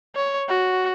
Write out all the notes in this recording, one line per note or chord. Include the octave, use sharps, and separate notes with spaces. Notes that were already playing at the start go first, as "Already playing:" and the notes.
C#5
F#4